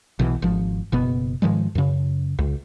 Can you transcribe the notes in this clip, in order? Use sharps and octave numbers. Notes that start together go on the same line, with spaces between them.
B1 B2 E3
G#1 F3
F#1 B2 B3
G#2 D#3 F3 G#3
F#2 C#3
C#2